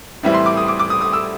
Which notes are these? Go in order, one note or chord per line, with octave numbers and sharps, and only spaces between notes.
A2 E3 G3 C4 E4
C6
D6
D#6
D6
D6
D#6
D#6
E6